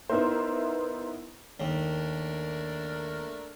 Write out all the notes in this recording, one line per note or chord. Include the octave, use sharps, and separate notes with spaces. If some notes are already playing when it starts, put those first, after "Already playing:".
B3 D#4 E4 A#4 C5
D#2 A3 D4 A#4